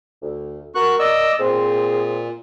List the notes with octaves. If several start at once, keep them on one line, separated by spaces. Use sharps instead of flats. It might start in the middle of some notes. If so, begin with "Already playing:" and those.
D2
F#4 A#4 C#6 F#6
D5 D#5 E6
A#2 C4 G#4